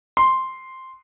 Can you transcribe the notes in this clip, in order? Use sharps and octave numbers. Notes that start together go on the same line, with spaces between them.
C6